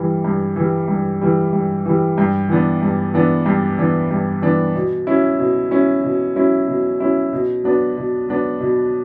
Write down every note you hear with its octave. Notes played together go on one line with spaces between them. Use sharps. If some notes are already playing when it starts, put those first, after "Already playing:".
Already playing: G2 E3 G3
G2
E3 G3
G2
E3 G3
G2
E3 G3
G2
E3 B3 D4
G2
E3 B3 D4
G2
E3 B3 D4
G2
E3 B3 D4
B2
F#3 C#4 E4
B2
F#3 C#4 E4
B2
F#3 C#4 E4
B2
F#3 C#4 E4
B2
F#3 B3 D4
B2
F#3 B3 D4
B2